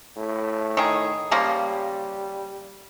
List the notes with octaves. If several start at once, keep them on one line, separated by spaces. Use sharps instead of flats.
A2
D#3 G#4
C#3 F3 G3 A#3